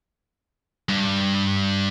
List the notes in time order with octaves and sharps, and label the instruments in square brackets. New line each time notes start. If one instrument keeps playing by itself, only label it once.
[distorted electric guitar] G2